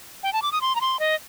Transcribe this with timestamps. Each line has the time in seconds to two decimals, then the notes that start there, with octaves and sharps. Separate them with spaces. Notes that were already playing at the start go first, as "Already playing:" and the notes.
0.23 G5
0.33 A5
0.42 D6
0.52 D#6
0.61 C6
0.75 A#5
0.81 C6
1.00 D#5